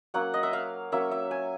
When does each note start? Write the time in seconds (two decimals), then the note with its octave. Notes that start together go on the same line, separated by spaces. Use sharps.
0.14 F#3 A#3 C#4 F#5
0.34 D#5
0.43 E5
0.53 F5
0.92 F#3 A#3 C#4 E5
1.11 E5
1.31 G#5